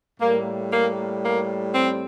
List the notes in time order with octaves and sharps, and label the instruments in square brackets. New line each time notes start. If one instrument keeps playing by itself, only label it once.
[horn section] A2 G3 A#3
A#3
A#3
C4